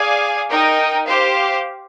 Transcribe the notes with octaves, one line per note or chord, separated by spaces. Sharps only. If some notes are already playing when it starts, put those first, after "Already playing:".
Already playing: G#4 D5 F5 G#5
D#4 A#4 D#5 G5
G4 C5 F5